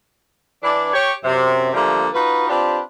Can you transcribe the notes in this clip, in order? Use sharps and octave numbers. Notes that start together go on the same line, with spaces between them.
E3 D4
G4 C#5
F#2 C3
D3 F3 G3 A3 A#3
D#4 F4 F#4 B4
C4 D4 F4 G4 B4